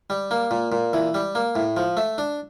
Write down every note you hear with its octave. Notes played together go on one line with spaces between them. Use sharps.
G3
A#3
A#2
A#2
E3
G3
A#3
A2
F3
A3
D4